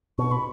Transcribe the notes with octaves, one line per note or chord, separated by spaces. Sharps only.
B2 C#6
B5